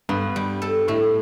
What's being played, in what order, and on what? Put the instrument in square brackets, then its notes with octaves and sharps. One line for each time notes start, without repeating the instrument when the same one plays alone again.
[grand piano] G2 [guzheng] B3
[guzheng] G3
A4
[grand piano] A2 [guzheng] A3